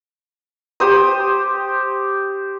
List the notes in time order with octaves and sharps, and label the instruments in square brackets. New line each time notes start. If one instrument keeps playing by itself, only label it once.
[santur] G4 C5 D#6